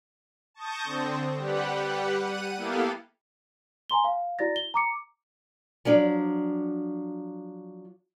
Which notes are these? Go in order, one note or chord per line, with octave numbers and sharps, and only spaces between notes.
A5 C#6 D#6 G6 A#6
D3 C4
G3 G4 B4 F#5
F#5 D#7
A#3 B3 E4 G4 A4 F5
G#5 A#5 C6 G7
F5
E4 F#4 D5 A6 A#6
G7
A#5 D6 C#7
F3 F#3 D4